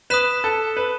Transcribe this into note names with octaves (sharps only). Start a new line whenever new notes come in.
B4 D#6 F#6 B6 E7
A4
B4